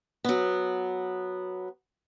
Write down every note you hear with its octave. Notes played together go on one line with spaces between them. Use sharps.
F#3 B3